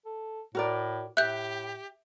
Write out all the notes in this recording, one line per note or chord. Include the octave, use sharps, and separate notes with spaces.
A4
A2 F#4 A#4 D5
A2 G4 E5 F#6 G6